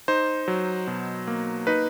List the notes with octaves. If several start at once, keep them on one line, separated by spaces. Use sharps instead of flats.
D#4 C5
F#3
B2
A#3
D#4 B4